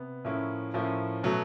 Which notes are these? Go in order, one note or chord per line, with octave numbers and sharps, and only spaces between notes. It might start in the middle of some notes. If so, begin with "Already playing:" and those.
Already playing: C3 B3
A2 F3 A#3 C#4 E4
A2 F3 A#3 C#4 E4
B2 F#3 A3